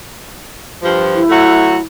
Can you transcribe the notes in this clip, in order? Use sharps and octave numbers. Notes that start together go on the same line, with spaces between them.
G2 F3
E4
F#3 A3 F#4